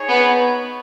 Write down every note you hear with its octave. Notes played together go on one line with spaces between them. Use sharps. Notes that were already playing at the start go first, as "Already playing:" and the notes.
Already playing: D#4 G#4 C#5
B3